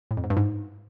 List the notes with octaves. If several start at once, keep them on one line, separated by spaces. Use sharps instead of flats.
A2
F2
G#2
G2
G#2